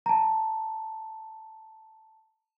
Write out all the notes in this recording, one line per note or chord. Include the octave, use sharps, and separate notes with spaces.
A5 A#5